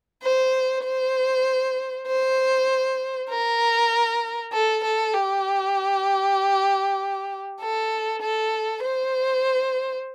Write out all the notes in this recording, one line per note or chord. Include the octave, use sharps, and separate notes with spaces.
C5
C5
C5
A#4
A4
A4
G4
A4
A4
C5